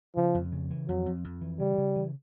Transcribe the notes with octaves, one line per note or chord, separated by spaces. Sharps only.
C#3 F3
F2
C#3
E3
F2 F#3
F2
F2
E3
C#3 G3
C#3
E3